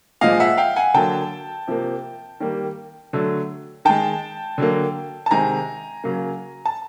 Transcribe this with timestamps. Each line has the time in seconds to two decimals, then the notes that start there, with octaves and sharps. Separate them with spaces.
0.21 A#2 F3 G#3 D#5 F5
0.40 E5 F#5
0.57 F5 G5
0.76 F#5 G#5
0.94 D3 F#3 A#3 G5 A5
1.68 C3 F3 A#3
2.40 D#3 G3 A#3
3.13 D3 F#3 A3
3.85 D#3 G#3 G5 A5
4.58 D3 F#3 A#3
5.26 A5
5.31 C3 D#3 G#3 G#5 A#5
6.04 C#3 F#3 A#3
6.65 A5